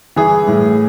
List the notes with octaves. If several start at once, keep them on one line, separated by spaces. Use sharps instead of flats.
E3 G#4
A2